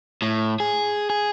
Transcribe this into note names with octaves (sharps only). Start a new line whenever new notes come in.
A2
G#4
G#4